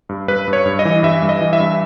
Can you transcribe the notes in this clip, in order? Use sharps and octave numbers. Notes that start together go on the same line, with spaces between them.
G2
G2 B4
G2
C#5
G2
D#5
E3
G2 E5
G2
D#5
E3
E5
G2